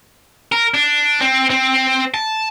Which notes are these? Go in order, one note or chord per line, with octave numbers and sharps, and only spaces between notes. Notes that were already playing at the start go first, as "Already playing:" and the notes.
A#4
D4
C4
C4
A5